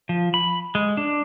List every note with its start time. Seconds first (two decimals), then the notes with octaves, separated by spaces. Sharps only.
0.09 F3
0.34 B5
0.75 G#3
0.97 D4